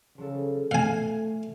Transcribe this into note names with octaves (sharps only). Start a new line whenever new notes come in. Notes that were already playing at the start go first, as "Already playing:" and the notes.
C#3 F3 F#3 A4
A3 F5 G#5